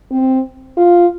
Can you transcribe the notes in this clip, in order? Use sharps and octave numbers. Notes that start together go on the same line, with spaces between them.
C4
F4